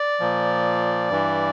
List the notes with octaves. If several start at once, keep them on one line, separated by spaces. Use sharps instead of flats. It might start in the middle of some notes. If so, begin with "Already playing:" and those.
Already playing: D5
A#2 F3
G2 E3